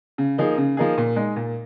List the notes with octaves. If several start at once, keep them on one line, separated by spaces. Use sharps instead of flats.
C#3
F3 A#3 D#4 G#4
C#3
F3 A#3 D#4 G#4
A#2
G#3 D#4
A#2